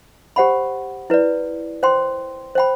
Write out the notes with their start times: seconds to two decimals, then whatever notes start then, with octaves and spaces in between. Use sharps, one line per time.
0.36 G4 C5 F#5 B5
1.10 E4 B4 D5
1.83 C5 G5 C6
2.55 C5 G5 B5